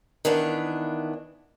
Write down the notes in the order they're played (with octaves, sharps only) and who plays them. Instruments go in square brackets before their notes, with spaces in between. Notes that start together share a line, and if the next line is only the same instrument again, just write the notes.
[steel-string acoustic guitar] D#3 E3 B3 D4